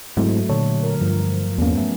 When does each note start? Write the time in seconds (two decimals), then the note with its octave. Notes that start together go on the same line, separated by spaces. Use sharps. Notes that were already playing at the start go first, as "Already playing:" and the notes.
0.17 G#2 F#3 A3 C4 E4
0.49 A#2 D3 C#5
0.83 A#4
1.01 G2 F3
1.58 E2 A#3 B3 C#4
1.77 A3